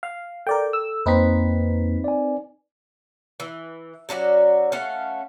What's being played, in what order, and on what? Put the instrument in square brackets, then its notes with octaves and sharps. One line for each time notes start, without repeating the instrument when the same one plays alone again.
[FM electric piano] F5
[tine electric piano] A4 [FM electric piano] A#4 D5 G5
[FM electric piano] E6
[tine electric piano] F2 A#3 B6 [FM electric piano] C4 D#4 B4
[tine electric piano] D5 G#5
[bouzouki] E3
F#3 C#4 F#4 D5
A3 C#4 F5 F#5